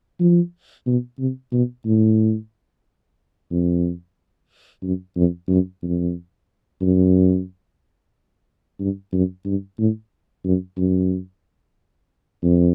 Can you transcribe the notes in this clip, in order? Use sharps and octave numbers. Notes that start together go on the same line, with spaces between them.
F3
B2
C3
B2
A2
F2
F#2
F2
F#2
F2
F#2
G2
F#2
G2
A2
F#2
F#2
F2